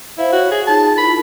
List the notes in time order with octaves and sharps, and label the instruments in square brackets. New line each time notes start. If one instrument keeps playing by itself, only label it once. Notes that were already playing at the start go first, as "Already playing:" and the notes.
[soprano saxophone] E4 [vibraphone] C5 F5
[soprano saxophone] F#4 [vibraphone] C#5
[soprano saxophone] G#4
[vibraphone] D#4 F4 G#4 [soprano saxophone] A5
[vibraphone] E4 F4 A#4 [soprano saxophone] B5